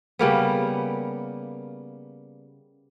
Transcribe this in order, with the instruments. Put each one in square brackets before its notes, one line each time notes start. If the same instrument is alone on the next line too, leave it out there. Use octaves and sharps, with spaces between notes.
[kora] C#3 G3 A#3 B3